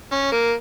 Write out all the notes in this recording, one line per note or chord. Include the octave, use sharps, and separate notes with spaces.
C#4
A#3